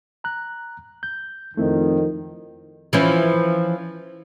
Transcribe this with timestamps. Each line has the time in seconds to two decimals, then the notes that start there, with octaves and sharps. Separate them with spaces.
0.24 A#5 F#6
1.03 G6
1.57 F2 D#3 A3 C4 E4
2.93 E3 F3 C#4